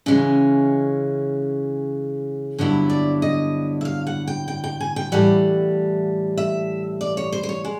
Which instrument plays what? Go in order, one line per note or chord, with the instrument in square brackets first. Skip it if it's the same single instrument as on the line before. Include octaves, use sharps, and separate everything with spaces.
[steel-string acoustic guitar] C#3 E3 G#3 C#4
G2 D3 F#3 B3 E4
D5
D#5
E5
F5
F#5
G5
G5
G5
G#5
G5
A2 E3 G3 F#5
E5
D5
C#5
C5
C5
C#5
G#3